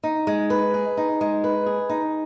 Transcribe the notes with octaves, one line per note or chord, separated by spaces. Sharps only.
D#4
G#3
B4
G#4
D#4
G#3
B4
G#4
D#4